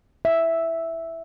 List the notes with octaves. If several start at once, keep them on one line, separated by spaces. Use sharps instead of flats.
E5